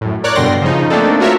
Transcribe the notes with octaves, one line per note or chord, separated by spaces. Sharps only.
F#2 A2
A#4 C#5 D5 F#6
G2 B2 D3 G5 C6 A#6
C#3 F3 D#4
A3 A#3 C4 D4 D#4 A4
F4 F#4 A#4 C#5 E5